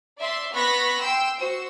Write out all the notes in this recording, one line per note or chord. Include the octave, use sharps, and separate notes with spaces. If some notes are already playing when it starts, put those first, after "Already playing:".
D5 E5 C6
B3 B5 C#6 F#6 A#6 B6
G5 C6 E6
F#4 C5 E6